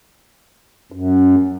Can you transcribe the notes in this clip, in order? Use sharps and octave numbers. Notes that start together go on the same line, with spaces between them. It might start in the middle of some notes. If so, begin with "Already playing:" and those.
F#2